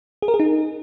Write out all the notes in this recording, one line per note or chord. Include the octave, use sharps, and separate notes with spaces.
G#4
A#4
G#4
D#4